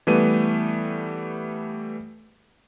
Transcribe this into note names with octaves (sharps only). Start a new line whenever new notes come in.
E3 G3 A3 B3 D#7